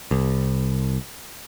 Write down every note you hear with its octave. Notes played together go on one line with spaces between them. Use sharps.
C2